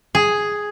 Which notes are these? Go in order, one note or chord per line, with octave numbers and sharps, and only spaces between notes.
G#4